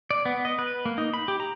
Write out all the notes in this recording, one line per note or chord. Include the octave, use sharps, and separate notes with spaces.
D5
B3
D#5
B4
A#3
D#4
B5
G4
A#5